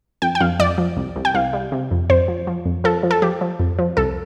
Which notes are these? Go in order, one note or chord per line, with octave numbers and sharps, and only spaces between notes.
F2 G5
G5
F2 F5
F2 D5
F3
C2
C2
G5
C2 F5
G3
C3
F2
F2 C5
F3
F3
F2
F3 A4
F3
A4
F3 G4
F3
F2
F3
C2 A4